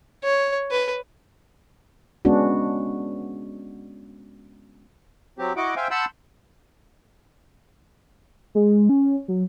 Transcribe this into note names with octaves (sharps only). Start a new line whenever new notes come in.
C#5
B4
G#3 B3 C#4 D4 F#4
F#3 C4 G4
E4 F#4 D#5 F#5 D6
C5 E5 F5 G5 G#5
F#5 A5 B5 C6 E6 G6
G#3
C#4
F#3